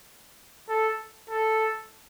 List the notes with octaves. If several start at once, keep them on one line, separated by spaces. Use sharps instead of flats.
A4
A4